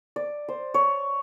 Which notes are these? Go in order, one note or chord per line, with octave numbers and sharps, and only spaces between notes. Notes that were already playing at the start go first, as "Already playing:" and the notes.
D5
C5
C#5